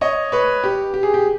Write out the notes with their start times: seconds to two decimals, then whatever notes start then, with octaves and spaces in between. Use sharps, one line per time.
0.01 C#5 D#5
0.32 B4 C#5
0.64 G4
0.94 G4
1.03 G#4
1.14 G4